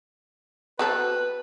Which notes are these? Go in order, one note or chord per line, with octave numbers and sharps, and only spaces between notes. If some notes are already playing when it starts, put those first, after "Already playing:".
F#3 C4 A4 B4